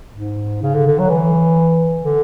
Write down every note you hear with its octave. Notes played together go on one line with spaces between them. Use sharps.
G#2
C#3
D3
D3
F#3
E3
D3